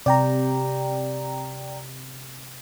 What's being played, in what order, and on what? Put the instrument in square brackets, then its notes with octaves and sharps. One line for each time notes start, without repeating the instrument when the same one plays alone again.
[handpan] C3 [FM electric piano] D5 G5 A#5